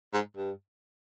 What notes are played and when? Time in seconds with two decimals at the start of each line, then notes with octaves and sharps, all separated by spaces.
0.13 G#2
0.37 G2